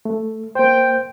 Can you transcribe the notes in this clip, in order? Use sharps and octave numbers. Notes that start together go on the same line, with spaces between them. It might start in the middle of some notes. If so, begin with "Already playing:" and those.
A3
A#3 C5 G5